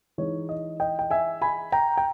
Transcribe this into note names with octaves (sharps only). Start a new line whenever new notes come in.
E3 G#3 D#4 C#5
D#5
D#5 G5
G5
E5 G#5
G#5 B5
G5 A#5
G5